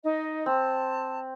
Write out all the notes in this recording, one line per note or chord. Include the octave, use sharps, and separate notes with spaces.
D#4 D#5
C4 A5